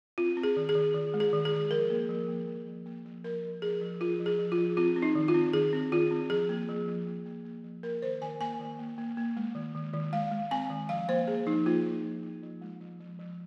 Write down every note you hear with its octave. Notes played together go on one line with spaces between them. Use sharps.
C4 F4
C4
G#4
D#3
G#4
D#3
D#3
G#3
G#4
D#3
G#4
D#3
F3 A#4
A#3
F3
A#3
A#3
F3
A#3
F3
F3 A#4
F3
F3 G#4
F3
F3 F4
F3
G#4
F3
F4
F3
C4 F4
C4
D#4
D#3
F4
C4
D#3 G#4
C4
D#3 F4
C4
F3 G#4
A#3
F3
F3
A#3
A#3
A#3
F3
A#3 A#4
D#3 C5
D#3 G#5
A#3 G#5
D#3
A#3
A#3
A#3
G#3
D#3
D#3
D#3
G#3 F5
G#3
C4 G#5
D#3
F3 F5
A#3 C5
A#3 G#4
F3 D#4
A#3 F4
F3
F3
A#3
F3
G#3
F3
F3
F3